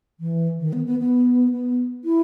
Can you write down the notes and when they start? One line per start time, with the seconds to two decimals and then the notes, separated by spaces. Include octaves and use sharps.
0.20 E3
0.60 D#3
0.73 B3
0.86 B3
0.99 B3
1.52 B3
2.04 E4